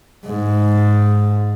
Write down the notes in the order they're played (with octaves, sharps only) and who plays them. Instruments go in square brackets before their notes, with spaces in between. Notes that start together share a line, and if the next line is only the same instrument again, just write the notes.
[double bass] G#2